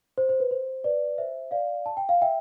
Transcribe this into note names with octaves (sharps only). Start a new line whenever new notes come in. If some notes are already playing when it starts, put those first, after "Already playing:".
C5
C5
B4
C5
B4 D5
C5 E5
D5 F5
A5
G5
F5
E5 G5